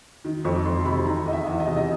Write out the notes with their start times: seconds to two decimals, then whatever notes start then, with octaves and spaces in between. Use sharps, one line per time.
0.25 D#3
0.45 F2 C#6
0.65 F2 C6
0.85 C3 B5
1.06 D#3 A#5
1.26 E2 D#5
1.33 E5
1.46 E2
1.60 D#5
1.67 C3
1.77 D#5